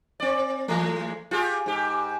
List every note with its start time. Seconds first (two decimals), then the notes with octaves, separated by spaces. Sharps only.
0.20 C4 D5
0.68 E3 G#3 A3
1.31 F4 G4 G#4
1.66 G#2 G4